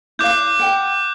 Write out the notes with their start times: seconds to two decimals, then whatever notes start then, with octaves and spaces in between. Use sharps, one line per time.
0.19 E4 D5 F5 D6 F#6 G6
0.59 F#5 G5